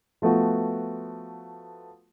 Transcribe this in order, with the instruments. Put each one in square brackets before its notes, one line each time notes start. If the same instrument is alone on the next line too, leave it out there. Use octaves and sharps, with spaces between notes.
[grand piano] F3 A3 B3 F#4